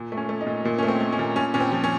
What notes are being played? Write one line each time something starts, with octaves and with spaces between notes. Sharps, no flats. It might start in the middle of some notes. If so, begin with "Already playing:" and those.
Already playing: A#2
A3
C#4
A3
D#4
A#2
A#2 A#3
A3 C#4
C4
A3
C#4
A#2
A#2 C#4
A#2 C#4
C4
F3
C#4